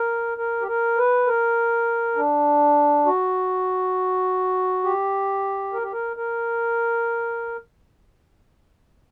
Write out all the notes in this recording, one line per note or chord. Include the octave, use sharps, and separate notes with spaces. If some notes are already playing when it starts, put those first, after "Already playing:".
Already playing: A#4
A#4
G4
A#4
B4
A#4
D4
F#4
G4
A#4
G4
A#4
A#4